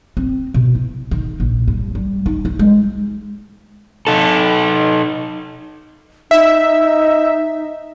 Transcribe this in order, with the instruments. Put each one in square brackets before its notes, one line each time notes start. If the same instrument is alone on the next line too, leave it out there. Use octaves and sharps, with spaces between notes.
[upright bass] C4
B2
E4
D#3
A#1
G2
G3
D#4
E4
G#3
[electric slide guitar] D#4 A4
[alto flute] D#4 [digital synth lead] E5